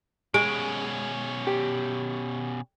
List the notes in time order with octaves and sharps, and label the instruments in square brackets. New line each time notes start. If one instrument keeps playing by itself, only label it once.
[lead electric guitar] B2 C#4 [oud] G#3 [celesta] D7
[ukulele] G4